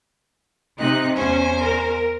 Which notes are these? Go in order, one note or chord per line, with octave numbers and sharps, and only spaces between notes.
C3 D#4 F#6
E2 C#4 C5 G#5
A#4